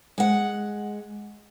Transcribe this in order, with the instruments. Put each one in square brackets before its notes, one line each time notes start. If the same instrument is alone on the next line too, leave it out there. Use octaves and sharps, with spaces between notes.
[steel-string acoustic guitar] G#3 F#5